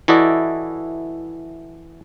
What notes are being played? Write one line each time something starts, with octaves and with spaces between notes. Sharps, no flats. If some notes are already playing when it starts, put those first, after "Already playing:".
E3 E4 F#4 A4 D5 D#5